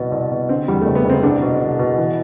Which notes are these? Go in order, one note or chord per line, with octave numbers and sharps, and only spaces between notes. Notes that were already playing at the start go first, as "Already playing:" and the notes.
Already playing: C2 B2 B3
C2
B2
D3 C4
E2 G3
A3
F#1
B3
F#1 C4
C2 D4
B2
C2
B2
E3